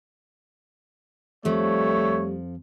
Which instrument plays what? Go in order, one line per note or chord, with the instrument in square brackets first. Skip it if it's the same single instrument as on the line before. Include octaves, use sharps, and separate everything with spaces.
[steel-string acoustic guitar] F2 F3 [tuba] G3 [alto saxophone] A3 [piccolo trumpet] C#5